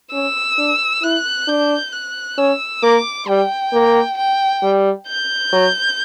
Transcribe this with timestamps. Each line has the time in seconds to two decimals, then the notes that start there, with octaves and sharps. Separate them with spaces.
0.13 C#4 E6
0.58 D4
1.03 E4 F#6
1.48 D4 G6
1.93 F#6
2.38 C#4 E6
2.83 A#3 D6
3.28 G3 G5
3.73 A#3
4.18 G5
4.63 G3
5.08 G6
5.52 F#3